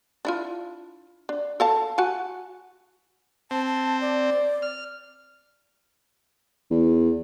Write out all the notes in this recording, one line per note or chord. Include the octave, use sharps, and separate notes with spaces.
D4 E4 F4
D4
A4 F5 A5
F#4 F#5 G#5
C4 A5
A5
D5
F6
E2